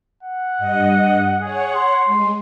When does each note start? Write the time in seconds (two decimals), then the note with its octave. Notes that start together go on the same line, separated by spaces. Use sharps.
0.23 F#5
0.58 G2 D#5
1.41 G#4 C#5 F#5
1.75 C6
2.05 G#3